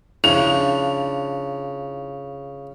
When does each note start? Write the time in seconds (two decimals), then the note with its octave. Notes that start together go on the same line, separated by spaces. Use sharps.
0.24 C#3 F3 D4 E4 F7